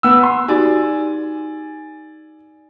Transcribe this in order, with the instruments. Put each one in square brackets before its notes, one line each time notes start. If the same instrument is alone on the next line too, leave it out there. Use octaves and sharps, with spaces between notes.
[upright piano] B3 E6
C6
[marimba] D#4 F#4 G4 [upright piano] D5 G#5